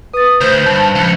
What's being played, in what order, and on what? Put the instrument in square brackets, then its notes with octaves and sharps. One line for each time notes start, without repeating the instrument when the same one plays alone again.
[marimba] B4 A6 [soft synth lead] D#6
[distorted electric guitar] D2 [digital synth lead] C5 [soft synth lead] G6
[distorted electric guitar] G2 [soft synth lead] A5
[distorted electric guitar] C#2 [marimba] F3 [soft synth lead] C#7